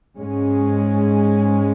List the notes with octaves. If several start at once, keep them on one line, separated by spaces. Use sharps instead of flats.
G#2 G#3 C#4